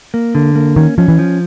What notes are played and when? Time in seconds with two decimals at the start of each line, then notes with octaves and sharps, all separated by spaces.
0.14 A#3
0.35 D3
0.55 A#3
0.76 D#3 C#4
0.98 F3 C#4
1.08 E3
1.19 F3